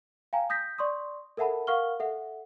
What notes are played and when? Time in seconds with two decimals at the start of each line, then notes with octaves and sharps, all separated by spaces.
0.33 F5 G5 G#5 A#5
0.50 D#6 G6 A#6 B6
0.78 D5 C6 C#6 D#6
1.37 A4 A#4 E5 F#5 A5 B5
1.67 A#4 F5 F#5 C#6 F6 G7
2.00 A4 E5 F#5